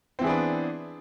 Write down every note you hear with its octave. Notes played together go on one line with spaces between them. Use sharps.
E3 B3 C4 D4 G#4